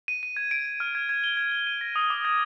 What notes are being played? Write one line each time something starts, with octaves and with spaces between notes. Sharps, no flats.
D#7
D#7
G#6
D7
D7
F6
G#6
G#6
G7
G#6
G#6
D#7
A#6
D#6
D6
G#6